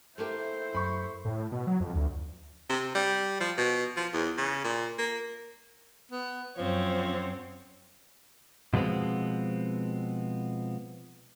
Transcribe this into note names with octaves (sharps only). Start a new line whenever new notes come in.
A3 A#3 E4 G4 C5
F#2 B5 C#6
A2
B2
F#3
F2
D2
C3
G3
F3
B2
F3
E2
C#3
A#2
A#3
B3
F#2 F3 C4 C#5
B2 F3 G#3 B3 C4